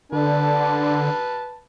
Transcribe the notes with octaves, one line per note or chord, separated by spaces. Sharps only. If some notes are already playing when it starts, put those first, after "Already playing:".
D3 D4 B4 A5